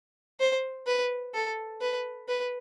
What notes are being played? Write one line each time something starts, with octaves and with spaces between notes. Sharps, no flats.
C5
B4
A4
B4
B4